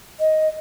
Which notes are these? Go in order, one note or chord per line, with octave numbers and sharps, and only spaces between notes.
D#5